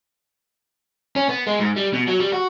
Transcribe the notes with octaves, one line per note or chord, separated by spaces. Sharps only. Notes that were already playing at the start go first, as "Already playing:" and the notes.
C#4
B3
G#3
G#2
G3
B2
F#3
G3
F#4